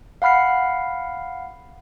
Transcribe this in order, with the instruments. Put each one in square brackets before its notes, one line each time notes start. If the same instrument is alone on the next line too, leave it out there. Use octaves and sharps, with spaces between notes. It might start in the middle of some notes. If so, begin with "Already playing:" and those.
[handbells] F5 F#5 B5 F6 C7